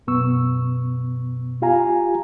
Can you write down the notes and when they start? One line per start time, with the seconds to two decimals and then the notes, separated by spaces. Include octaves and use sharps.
0.07 F#2 B2 B3 C#6 E6
1.62 F4 G4 F5 G#5 A#5